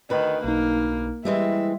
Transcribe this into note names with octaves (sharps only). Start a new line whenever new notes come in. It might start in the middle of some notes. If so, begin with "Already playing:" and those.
D2 D#3 B4
B1 A#3 D#4
E3 G3 G#3 C4 E5